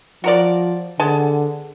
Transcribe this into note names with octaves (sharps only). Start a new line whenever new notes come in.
F3 F#4 A#4 D5
D3 B3 G#4 A5